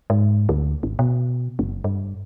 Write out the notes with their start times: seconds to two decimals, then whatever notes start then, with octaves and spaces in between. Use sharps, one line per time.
0.10 G#2
0.49 D2
0.83 G#1
0.99 B2
1.59 F#1
1.84 G2